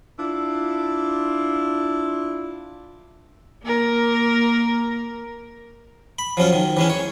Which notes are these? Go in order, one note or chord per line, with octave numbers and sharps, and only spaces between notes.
D4 E4 F4
A#3 A#4
B5
F3 F#3 C#4 F4
D#3
E3 G#3 C#4
C#5